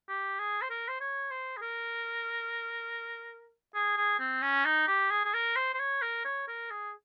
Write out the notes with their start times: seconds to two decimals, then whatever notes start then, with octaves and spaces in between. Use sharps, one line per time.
0.08 G4
0.39 G#4
0.62 C5
0.70 A#4
0.88 C5
1.00 C#5
1.31 C5
1.57 G#4
1.61 A#4
3.74 G#4
3.97 G#4
4.19 C4
4.42 C#4
4.65 D#4
4.88 G4
5.11 G#4
5.25 G#4
5.34 A#4
5.56 C5
5.73 C5
5.79 C#5
6.02 A#4
6.25 C#5
6.48 A#4
6.70 G#4